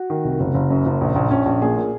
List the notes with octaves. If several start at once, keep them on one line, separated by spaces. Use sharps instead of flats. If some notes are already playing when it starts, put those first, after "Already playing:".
Already playing: F#4
D#3
C2
F#1
F#1
F#2
F#1
A#1
A#1
A#1 C#4
A#1
A#2 G#4
A#2